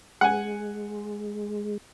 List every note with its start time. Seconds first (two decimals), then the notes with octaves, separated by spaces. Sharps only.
0.21 G#3 F#5 G#5